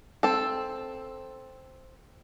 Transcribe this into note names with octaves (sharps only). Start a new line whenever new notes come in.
C4 A4